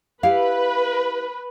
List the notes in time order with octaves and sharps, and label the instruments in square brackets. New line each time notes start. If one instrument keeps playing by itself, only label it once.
[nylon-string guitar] E4 G4 F5 [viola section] B4